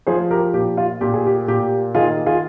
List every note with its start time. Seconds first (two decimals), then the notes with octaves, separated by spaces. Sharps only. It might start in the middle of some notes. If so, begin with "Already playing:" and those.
0.07 F3 G#4 C5
0.31 G4 A#4
0.53 A#2 G4
0.77 F4
1.01 A#2 G4
1.14 G#4
1.27 G4
1.48 A#2 G4
1.95 D#3 F4 G#4
2.26 F4 G#4